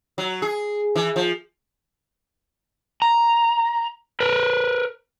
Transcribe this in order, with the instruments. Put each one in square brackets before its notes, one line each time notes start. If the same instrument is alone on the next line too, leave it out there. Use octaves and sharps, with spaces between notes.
[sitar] F#3
G#4
E3
F3
[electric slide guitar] A#5
A#4 B4